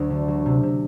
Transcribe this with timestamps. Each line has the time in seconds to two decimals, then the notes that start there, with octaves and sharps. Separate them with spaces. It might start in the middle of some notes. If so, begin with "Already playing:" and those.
Already playing: D2 F#3
0.10 D3
0.28 F#3
0.46 C3
0.63 C3